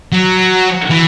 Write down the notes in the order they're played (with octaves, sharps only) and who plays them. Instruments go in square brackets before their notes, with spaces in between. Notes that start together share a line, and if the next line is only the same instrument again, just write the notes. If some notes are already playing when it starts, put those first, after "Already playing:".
[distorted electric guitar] F#3
E3